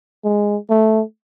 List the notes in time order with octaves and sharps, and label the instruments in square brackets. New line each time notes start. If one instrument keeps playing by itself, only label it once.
[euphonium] G#3
A3